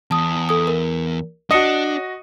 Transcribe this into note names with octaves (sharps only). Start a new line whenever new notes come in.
E2 A5 D#6
A4 D#6
A#4
D4 F#4 D#5 D#6 C#7